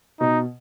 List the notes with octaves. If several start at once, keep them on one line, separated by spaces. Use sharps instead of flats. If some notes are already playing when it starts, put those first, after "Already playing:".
B2 D#4